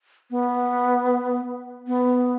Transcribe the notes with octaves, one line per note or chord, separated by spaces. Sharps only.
B3
B3